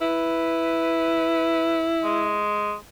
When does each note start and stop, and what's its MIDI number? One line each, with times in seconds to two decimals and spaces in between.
0.01 2.42 64
0.01 1.90 71
2.04 2.75 56